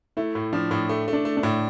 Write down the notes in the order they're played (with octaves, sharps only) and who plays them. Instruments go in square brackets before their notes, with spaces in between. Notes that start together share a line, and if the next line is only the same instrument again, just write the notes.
[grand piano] A3 [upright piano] E4
[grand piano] A2
[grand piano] F3 [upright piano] D4
[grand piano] A2
A3
A3
[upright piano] D4
[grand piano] A3
[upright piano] D4
[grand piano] A2